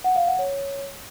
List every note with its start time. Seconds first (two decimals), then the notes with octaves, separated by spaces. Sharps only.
0.04 F#5
0.16 F5
0.27 F#5
0.39 C#5